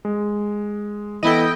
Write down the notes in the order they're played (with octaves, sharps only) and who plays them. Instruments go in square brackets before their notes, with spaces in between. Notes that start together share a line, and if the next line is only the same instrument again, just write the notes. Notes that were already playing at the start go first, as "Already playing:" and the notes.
[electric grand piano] G#3
[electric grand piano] E3 B3 A4 [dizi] E4 [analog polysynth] D#5 G5